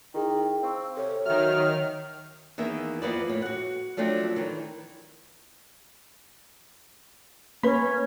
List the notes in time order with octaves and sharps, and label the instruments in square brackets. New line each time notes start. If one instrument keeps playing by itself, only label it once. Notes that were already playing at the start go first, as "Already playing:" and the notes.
[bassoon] D#3 [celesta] E4 G#4 [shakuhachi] G5
[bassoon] C4 [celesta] F5 C#6 E6
[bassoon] C3 [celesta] A4 [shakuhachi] C#5
[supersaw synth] D#3 F6 [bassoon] F#3 [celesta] E5
[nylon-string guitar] E2 D#3 A#3 E5
F2 F3 A#3 B3 E4 D5
A2
F#4 F#5
F3 F#3 A3 C4 D4
D#3 E3
[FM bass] A#3 [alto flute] C#4 [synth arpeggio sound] B4 B5